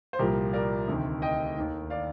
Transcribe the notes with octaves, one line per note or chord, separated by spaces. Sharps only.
C5
C2 A#2 F3 G4 A#4
A#4 D5
D2 C3 D#3
D#5 G5
D#2 D#3
D5 F5